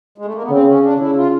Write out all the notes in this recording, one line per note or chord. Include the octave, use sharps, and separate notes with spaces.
G#3
A3
A#3
B3
C#3 C4
C#4
D4
C#3 E4
F4